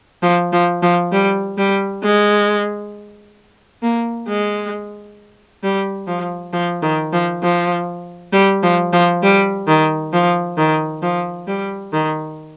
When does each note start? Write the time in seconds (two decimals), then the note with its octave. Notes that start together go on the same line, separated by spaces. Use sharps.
0.22 F3
0.53 F3
0.82 F3
1.12 G3
1.58 G3
2.03 G#3
3.82 A#3
4.27 G#3
5.63 G3
6.07 F3
6.53 F3
6.82 D#3
7.13 F3
7.43 F3
8.33 G3
8.63 F3
8.93 F3
9.23 G3
9.67 D#3
10.13 F3
10.57 D#3
11.02 F3
11.48 G3
11.93 D#3